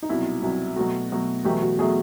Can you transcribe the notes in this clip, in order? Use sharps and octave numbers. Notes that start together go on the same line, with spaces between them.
D#4
C2 B2 F#3 E4
C2 B2 F#3
B2 F#3 A3 F#4
B2 F#3 A3
E2 B2 F#3 A3 G4
F#4
B2 F#3 A3 G#4